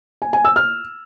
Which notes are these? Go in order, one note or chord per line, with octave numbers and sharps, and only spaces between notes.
G#5
G#5
E6
F6